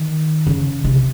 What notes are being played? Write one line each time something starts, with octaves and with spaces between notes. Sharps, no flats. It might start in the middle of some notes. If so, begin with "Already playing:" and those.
Already playing: D#3
C#3
C3